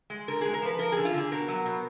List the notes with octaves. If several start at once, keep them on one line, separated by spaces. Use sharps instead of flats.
G#3
D3 A#4
G#3 G#4
A#4
F3 B4
F3 A#4
D3 G#4
F4
D3 G#4
B2 A#4
F#3
B2